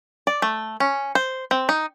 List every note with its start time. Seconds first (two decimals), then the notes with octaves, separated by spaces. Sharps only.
0.27 D5
0.42 A3
0.80 C#4
1.15 C5
1.51 C4
1.69 D#4